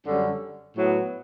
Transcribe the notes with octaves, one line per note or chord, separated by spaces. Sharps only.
F#2 D3 G3 C#4
A2 F#3 B3